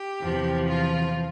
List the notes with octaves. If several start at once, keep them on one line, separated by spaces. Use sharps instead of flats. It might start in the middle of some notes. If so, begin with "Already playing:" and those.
Already playing: G4
E2 C3 F3
F4